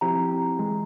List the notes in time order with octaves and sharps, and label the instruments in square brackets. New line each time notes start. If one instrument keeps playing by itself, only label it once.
[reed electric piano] F3 C4 E4 G4 [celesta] A#5
[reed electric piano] E3 G#3